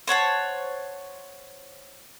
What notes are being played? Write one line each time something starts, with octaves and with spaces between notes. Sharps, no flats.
C5 C#5 F#5 A5